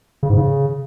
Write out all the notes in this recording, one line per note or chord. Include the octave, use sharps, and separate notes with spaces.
C#3
G#2
C#3